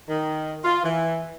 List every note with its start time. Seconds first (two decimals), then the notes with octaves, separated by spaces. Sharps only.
0.09 D#3
0.64 F4
0.83 E3